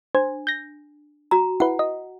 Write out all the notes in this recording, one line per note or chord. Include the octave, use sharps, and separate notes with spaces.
D4 C5
G6 A#6
F#4 A#5
E4 B4 F#5
D#5